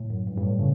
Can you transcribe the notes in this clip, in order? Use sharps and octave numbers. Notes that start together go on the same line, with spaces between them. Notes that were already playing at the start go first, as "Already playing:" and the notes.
Already playing: A2
F#2
G2
G2
A2
A2 C#3